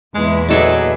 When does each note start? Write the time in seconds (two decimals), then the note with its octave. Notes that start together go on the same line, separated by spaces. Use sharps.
0.15 E2 A#2 G#3 E4
0.49 F#3 G#4 A4 D5 D#5